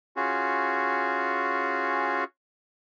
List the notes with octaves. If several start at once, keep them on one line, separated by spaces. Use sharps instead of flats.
C#4 F4 F#4 G#4